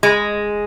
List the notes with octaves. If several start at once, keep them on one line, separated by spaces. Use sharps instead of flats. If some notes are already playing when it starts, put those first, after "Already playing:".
G#3